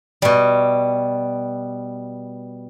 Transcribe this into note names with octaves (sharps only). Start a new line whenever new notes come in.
B2 G3